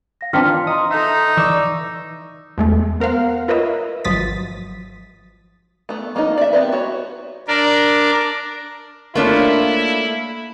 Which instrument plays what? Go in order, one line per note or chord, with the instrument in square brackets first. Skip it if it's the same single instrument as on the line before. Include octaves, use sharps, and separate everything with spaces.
[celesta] F5 A#6
[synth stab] D#3 C4 D4 [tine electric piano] E3 F4 [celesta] F6 B6 C#7
[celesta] D#5 A#5 C6 [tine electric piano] D#6
[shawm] D#4 [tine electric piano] A4 E5
[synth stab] E3 [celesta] D5 D6 [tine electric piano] C#6 E6
[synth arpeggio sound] E2 G#3 A3
B3 A#4 C5 F5 F#5
F4 A#4 B4 C#5 D#5 E5
G#1 F3 F#3 D#6 A6 B6
[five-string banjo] A3 B3
F3 A#3 B3 C#4 D#4
D5 E5
B3 C4 G4 B4
F#4 C#5
[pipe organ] D4 A#4 D5
[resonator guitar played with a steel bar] A3 D4 F4 [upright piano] A#3 C#5 [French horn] E4